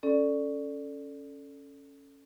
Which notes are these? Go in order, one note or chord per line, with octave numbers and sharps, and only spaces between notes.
C#4 A4 D5